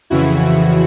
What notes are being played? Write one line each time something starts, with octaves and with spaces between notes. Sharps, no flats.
F2 C#3 E3 E4 F#4